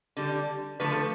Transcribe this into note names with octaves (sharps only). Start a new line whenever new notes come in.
D3 G3
D3 F3 A3 B4
A4